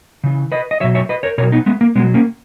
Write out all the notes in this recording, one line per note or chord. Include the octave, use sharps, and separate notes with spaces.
C#3 E3
B4 D#5
D#5
B2 F#3 C#5 E5
C#5 E5
B4 D#5
A#4 C#5
B2 F#3 A#4 C#5
B3 D#4
G#3 B3
A#3
B2 F#3 G#3 B3
A#3 C#4